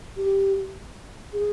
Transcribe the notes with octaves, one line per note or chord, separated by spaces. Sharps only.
G4
G#4